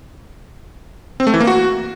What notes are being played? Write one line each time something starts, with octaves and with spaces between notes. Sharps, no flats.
C4
A3
E3
A#3
F#4